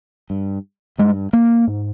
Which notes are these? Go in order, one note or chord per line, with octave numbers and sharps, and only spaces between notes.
G2
G2 G#3
A#3
G#2